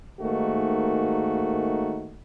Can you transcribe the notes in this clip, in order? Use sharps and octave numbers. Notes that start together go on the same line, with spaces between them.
G#2 D#3 A3 A#3 F#4